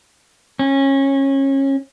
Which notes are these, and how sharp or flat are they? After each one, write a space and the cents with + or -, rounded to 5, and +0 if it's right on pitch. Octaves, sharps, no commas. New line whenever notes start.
C#4 -25